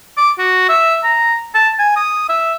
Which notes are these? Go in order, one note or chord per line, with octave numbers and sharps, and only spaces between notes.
D6
F#4
E5
A#5
A5
G#5
D#6
E5